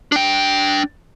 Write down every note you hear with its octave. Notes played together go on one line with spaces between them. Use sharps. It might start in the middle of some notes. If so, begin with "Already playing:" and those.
D4 G5